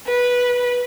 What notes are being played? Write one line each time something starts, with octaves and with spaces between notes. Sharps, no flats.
B4